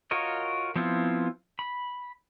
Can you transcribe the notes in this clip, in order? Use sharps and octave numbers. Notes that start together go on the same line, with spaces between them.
F4 F#4 A#4 C#5 D#5
F3 B3 C4 E4 F4
B5